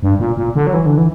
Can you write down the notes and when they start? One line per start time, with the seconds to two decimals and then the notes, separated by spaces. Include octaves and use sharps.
0.03 G2
0.19 A#2
0.37 A#2
0.55 D3
0.67 F#3
0.73 E3
0.86 D3
0.98 E3